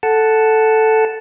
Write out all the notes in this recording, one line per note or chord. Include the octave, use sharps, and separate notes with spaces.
A4 F#5 A5